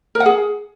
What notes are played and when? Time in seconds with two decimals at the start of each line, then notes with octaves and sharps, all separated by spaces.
0.15 A#4
0.20 F#5
0.26 G#4